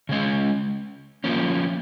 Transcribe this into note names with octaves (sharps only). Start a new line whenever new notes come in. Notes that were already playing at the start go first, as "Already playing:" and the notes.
C#3 G#3 C#4
F3 A#3 C#4